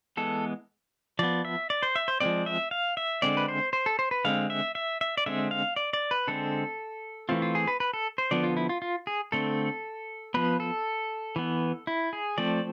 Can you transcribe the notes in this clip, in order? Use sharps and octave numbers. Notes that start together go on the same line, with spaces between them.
E3 G#3 B3 A4
F3 B3 D5
E5
D5
C5
E5
C5
F3 G#3 C4 D5
E5
F5
E5
D3 G#3 C4 D5
B4
C5
C5
A4
C5
B4
D3 G#3 C4 F5
E5
E5
E5
D5
D3 G#3 C4 E5
F5
D5
D5
B4
D3 G#3 C4 A4
E3 A3 C4 F4
F4
G#4
B4
B4
A4
C5
D3 F3 B3 D5
F4
E4
F4
F4
G#4
D3 A3 C4 A4
F3 B3 B4
A4
E3 B3
E4
G#4
F3 A3 C4 D5